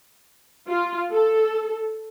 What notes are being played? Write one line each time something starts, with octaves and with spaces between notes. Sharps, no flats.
F4
A4